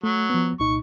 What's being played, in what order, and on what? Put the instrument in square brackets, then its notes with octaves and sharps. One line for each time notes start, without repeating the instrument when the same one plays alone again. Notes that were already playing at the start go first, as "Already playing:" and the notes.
[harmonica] F#3 [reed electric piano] A3
[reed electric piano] F3 B3
[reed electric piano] C2 A#2 D#4 [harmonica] C#6